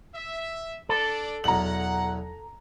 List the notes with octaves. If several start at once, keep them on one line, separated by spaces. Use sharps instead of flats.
E5
D4 A4 D5
B1 E2 F#5 A#5 F#7